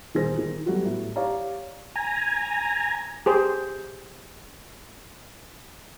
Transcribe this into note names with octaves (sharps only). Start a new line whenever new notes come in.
D#1 D#3 D#4 G#4 C5 A#6
D#3
F#3 G3 A3 B3 F#4 G4
A2
G4 C#5 D5 F5 A#5
G#5 A#5
G4 G#4 C5